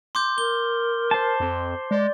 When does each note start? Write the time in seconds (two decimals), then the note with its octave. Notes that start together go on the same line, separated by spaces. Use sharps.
0.15 C6 D6 G6
0.38 A#4 G7
1.11 C5 A5
1.40 F2
1.91 G#3 D5